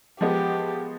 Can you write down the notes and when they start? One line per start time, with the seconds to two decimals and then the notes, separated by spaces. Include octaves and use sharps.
0.21 F3 G#3 B3 G4